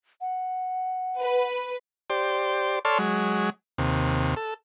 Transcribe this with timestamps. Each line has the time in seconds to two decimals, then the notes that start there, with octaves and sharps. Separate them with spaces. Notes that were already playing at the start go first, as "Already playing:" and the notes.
0.21 F#5
1.19 B4
2.10 G4 C5 D5
2.85 A4 C#5 D5 A5 C6 F6
2.99 F#3 G#3
3.78 D#2 C3
4.36 A4